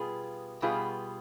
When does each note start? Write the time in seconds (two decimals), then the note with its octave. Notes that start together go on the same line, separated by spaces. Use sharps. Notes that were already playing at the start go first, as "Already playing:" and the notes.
Already playing: B2 G3 B3 F4 G#4
0.62 B2 G3 B3 F4 G#4